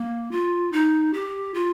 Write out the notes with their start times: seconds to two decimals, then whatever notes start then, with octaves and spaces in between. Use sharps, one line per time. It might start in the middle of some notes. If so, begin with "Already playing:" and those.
Already playing: A#3
0.31 F4
0.72 D#4
1.14 G4
1.54 F4